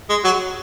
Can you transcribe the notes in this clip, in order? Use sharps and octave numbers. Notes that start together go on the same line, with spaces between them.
G#3
F#3